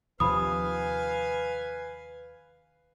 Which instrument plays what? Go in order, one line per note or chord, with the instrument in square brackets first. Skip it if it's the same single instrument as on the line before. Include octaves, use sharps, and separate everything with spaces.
[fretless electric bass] D#2 C3 F3 [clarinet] B4 [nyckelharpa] F5 G#5 [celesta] B5 D#6